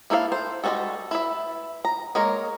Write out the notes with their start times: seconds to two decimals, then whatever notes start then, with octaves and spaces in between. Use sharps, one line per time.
0.10 A#3 E4 A4 C5 F5
0.32 C5
0.64 G3 G#3 C#4 F#4 A4
1.11 E4 B4 E5
1.85 A#5
2.15 G#3 A#3 A#4 C#5